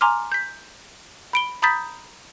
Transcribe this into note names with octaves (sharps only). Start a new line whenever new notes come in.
G#5 A#5 C6 D6 F6
G6 B6
B5 D7 G7
A#5 B5 D#6 G6 A6 B6